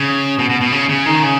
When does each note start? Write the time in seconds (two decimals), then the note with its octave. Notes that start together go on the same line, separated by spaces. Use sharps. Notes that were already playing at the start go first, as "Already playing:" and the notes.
Already playing: C#3
0.39 B2
0.50 B2
0.61 B2
0.72 C#3
0.89 C#3
1.06 D#3
1.23 C#3